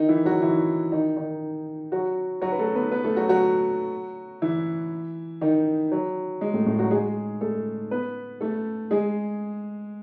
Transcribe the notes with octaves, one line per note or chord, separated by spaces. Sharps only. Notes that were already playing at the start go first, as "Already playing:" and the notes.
Already playing: D#3 D#4
E3 E4
F#3 F#4
E3 E4
D#3 D#4
D#3 D#4
F#3 F#4
F#3 F#4
B4
A3 A4
B3 B4
B3 B4
A3 A4
F#3 F#4
F#3 F#4
E3 E4
D#3 D#4
F#3
G#3
A2 A3
A2 A3
F#3 F#4
G#3 G#4
A3 A4
B3 B4
A3 A4
G#3 G#4